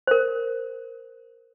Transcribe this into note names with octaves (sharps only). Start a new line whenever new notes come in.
A#4 C5